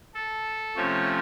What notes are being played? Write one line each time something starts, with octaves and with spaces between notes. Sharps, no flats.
A4
C3 F3 A3 C#4 C#5